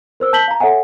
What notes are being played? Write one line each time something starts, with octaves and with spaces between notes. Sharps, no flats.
A#4 C5 E6
A5 G6 B6 F#7 G7
F5 A#5
A4 C#5 E5 F#5 G#5